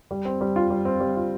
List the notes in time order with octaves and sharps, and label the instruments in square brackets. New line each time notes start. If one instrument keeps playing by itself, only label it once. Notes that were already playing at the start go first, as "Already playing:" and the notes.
[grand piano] G3
C4
G3
F4
G3
C4
G3
F4